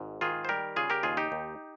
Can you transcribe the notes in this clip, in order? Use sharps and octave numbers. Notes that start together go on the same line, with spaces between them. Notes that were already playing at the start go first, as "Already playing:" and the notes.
Already playing: G#1 G#2
D#3 F4 G#4
C5
G3 G4 A#4
C#3 F4 G#4
G4 A#4
D#2 F4 G#4
D#4 G4
D#2